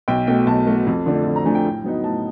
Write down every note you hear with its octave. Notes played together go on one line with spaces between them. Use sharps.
B1 G5
B2 F#3 A3 G5
B1 A5
B2 F#3 A3
F2
D3 F3 A3 D4
F2
A#5
D3 F3 A3 D4 G#5
G5
A2
F#3 B3 D#4
A2 A5